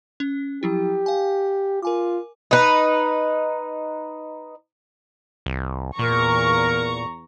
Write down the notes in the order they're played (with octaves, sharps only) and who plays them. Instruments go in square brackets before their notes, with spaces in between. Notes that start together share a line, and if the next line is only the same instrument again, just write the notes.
[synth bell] C#4
[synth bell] F3 F#3 E4 [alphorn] G4
[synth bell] F5 G#5
[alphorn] F4 [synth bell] A#4 G#5 D6
[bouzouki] D#4 B4
[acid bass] C2
[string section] E2 A#5 C#6 [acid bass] A#2 [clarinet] A#4